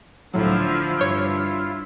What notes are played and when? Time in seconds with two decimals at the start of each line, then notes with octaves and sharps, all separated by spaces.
0.34 C#2 A2 D3 F3 F#3 E4 F4
0.97 G2 C#5 G6 D7